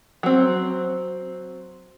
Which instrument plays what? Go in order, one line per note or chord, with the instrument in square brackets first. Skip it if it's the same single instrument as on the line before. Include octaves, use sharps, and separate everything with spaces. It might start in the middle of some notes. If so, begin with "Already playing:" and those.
[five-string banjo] F#3 C4